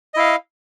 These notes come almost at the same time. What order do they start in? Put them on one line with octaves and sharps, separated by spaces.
D#5 E4 F5